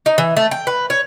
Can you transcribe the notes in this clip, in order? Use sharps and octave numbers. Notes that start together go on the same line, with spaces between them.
D#4
E3
A3
G5
B4
C#5